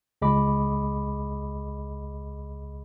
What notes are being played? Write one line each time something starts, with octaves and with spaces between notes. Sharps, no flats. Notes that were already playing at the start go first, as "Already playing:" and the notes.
C#2 G#4 D#5 B5 D6